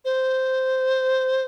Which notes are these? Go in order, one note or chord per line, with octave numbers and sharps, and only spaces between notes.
C5